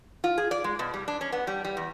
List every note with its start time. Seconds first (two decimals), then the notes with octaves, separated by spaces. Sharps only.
0.24 F4
0.38 G#4
0.51 D5
0.64 G#3
0.79 B2
0.94 G3
1.08 D4
1.21 C#4
1.32 B3
1.47 G3
1.65 G3
1.77 E2